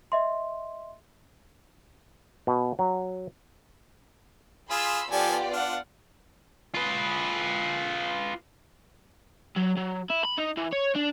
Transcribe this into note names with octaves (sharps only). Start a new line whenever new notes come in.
D#5 E5 C6
B2
F#3
F4 G#4 B5 C6 E6
F3 B3 F4 G4 A4 D5 G#5
D4 F5 F#5
F4 B4
F#3
F#3
E4
B5
D#4
E3
C#5
D4